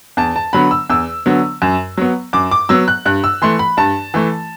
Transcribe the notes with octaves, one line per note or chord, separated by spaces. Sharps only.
E2 A5
A5
D3 F#3 B3 B5
E6
E2 E6
D3 F#3 B3
F#2
F#3 B3
F#2 D6
D6
F#3 B3 E6
F#6
G2 F#6
E6
E3 A3 C6
B5
G2 A5
E3 A3